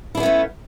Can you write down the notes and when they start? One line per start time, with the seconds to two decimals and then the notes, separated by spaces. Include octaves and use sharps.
0.15 E4
0.17 D4
0.20 B3
0.23 C#4
0.26 A3